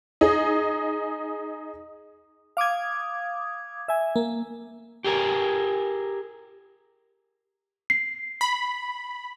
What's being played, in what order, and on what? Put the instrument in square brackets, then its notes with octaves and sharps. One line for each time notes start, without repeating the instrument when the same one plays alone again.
[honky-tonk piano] D#4 G#4
[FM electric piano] F5 D6 D#6 G#6
E5 G#5
A#3
[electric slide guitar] G4 G#4 A#4
[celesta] C7
[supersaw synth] B5